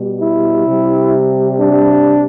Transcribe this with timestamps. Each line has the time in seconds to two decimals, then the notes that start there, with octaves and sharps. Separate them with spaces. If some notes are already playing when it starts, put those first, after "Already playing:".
Already playing: B2 G3
0.21 E4
0.67 C3 G3
1.59 D4